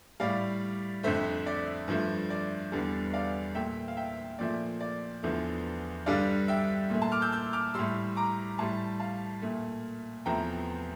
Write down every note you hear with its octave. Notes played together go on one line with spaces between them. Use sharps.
A2 G3 D5 F5
F2 D3 A3 C5 E5
D5
G2 F3 A3
D5
E2 D3 G3
D5 F5
A#2 A3 E5 G5
F5
E5 G5
A#2 F3 A3 D5
D5
E2 D3 F3 A3
G2 D3 G3 D5 F5
E5 G5
A#2 A3
A5 C6
D6 F6
E6 G6
E6 G6
D6 F6
A2 G3 C6 E6
A#5 D6
A2 G3 A5 C6
F5 A5
A#2 A3
E2 C3 F3 A3 G5 A#5